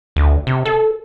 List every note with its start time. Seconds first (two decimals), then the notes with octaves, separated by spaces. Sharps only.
0.16 D2
0.47 C3
0.65 A4